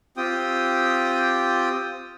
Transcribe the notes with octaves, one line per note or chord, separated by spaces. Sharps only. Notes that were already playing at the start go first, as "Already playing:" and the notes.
C4 F4 G4 G5 D#6